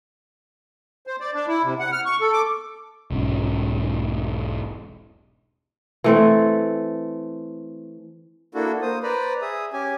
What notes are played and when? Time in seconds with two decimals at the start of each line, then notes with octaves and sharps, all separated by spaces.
1.07 C5
1.20 D5
1.34 D4
1.48 E4
1.63 C3
1.79 F#5
1.93 F6
2.06 C#6
2.21 A4
2.33 D6
3.10 E1 B1 G#2 C#4
6.04 E3 A3 C4
8.55 A#3 D4 E4 F#4 A4
8.82 A#3 C5 D#6
9.03 B4 C5 D5 A#5 B5
9.42 G#4 E5 D#6
9.73 C#4 G4 G#5